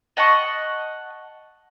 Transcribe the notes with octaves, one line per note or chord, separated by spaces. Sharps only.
D#5 F#5 A5 C#6